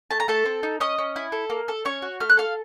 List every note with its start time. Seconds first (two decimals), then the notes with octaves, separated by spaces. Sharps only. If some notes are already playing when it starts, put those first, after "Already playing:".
0.11 A3 A5
0.20 A#5
0.28 A3 A4 A5
0.46 C4
0.63 D#4
0.80 C#4 D#5 D#6
0.98 C#4
1.16 E4
1.32 A4
1.50 A#3
1.68 A4
1.85 C#4 C#5 C#6
2.02 F#4
2.20 A3 F6
2.30 F#6
2.37 A4 F5 F6